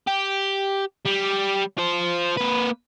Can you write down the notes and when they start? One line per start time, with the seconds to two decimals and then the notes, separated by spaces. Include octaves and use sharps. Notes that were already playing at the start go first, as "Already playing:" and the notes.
0.07 G4
1.05 G3
1.78 F4 C5
2.37 A#3 B4